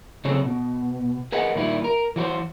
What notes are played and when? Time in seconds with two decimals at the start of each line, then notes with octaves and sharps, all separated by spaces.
0.25 C#3 F#3 C4 G#4 A4
0.45 B2
1.32 G#4 A#4 B4 D#5 F#5 G#5
1.55 A#2 D#3 G3 E4 F4
1.84 A#4
2.16 E3 F#4 B4 C5